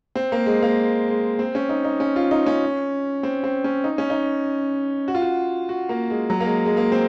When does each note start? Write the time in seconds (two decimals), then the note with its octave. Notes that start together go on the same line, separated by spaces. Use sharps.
0.15 C4
0.32 A#3
0.46 G#3
0.62 A#3
1.08 G#3
1.39 C4
1.55 C#4
1.69 D#4
1.84 D#4
2.00 C#4
2.16 F4
2.31 D#4
2.46 C#4
3.23 C4
3.44 C4
3.64 C#4
3.84 D#4
3.98 C#4
4.10 D#4
5.08 F#4
5.15 F4
5.22 F#4
5.69 F#4
5.89 A#3
6.10 G#3
6.30 F#3
6.40 A#3
6.46 G#3
6.65 G#3
6.77 A#3
6.92 C4